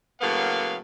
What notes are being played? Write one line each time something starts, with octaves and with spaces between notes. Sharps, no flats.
A2 C#3 F#3 A#3 B3 F5